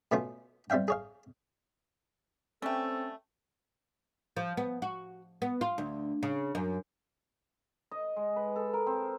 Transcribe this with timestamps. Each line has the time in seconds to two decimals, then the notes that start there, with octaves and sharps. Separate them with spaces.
0.12 B2 A3 B3 C#4 F4
0.70 G3 C4 E5 F5 G5
0.88 G#4 C#5 F5
2.62 G3 A3 C4 C#4 A4 B4 G5
4.37 F3
4.57 B3
4.82 F#4
5.42 B3
5.61 F4
5.78 D2
6.23 C#3
6.55 F#2
7.91 D#5
8.16 G#3
8.36 B4
8.56 A4
8.74 A#4
8.87 C4